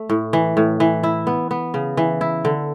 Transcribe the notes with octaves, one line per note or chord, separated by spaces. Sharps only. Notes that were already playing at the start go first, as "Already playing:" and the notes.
Already playing: A3
A2
E3
A2
E3
E4
B3
B3
C#3
E3
E4
D3